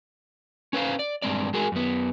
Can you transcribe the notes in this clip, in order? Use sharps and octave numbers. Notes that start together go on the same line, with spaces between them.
C#4 B4 C5 F5
D5
G2 G#3 C4 D5
G#3 F#4 G#4 A#4
F#2 B3